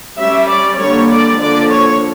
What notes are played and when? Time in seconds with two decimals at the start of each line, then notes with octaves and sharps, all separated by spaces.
0.17 G3 C#4 E5
0.48 D5
0.78 D3 G3 A#3 C#5
1.10 D5
1.39 D3 F3 A#3 D5
1.70 C#5